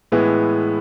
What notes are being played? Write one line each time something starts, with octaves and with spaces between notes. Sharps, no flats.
A2 E3 G#3 B3 E4